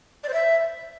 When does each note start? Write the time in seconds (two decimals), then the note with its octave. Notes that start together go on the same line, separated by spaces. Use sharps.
0.24 D5
0.29 C5
0.34 E5